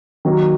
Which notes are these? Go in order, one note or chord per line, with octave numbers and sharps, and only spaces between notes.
D#3 F#3 A#3